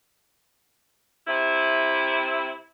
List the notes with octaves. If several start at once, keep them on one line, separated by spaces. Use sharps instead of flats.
C3 E4